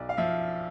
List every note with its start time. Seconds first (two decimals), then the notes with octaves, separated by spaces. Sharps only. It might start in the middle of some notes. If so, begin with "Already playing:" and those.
Already playing: B1 D5
0.09 F5
0.17 F3 E5